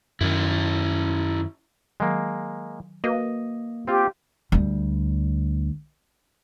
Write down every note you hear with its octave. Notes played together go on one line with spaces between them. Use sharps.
F#2 D#3 C#4 E4
D#3 F#3 G#3 A#3
A#3 F#4 A#4 B4 D#5
C4 F4 G4
D2 G3